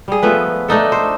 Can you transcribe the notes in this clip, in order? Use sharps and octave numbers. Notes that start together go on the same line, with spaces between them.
G3 G#4
F3 A3 B3 B4
A3 D4 D#4 A4
C5